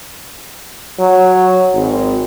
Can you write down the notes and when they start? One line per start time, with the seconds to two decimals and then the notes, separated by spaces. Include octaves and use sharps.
0.99 F#3
1.74 G#1